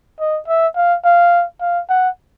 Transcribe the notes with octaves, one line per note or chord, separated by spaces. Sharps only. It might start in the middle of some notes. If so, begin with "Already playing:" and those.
D#5
E5
F5
F5
F5
F#5